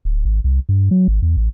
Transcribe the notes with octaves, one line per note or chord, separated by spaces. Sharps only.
D1
G#1
C2
G2
F#3
G#1
E2
A1